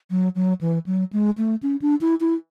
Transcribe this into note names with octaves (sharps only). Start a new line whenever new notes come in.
F#3
F#3
E3
F#3
G#3
A3
C#4
D4
E4
E4